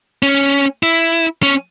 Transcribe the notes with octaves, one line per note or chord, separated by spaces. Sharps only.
C#4
E4
C#4